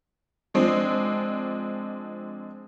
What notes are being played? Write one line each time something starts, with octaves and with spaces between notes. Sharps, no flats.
F3 G#3 C4 D4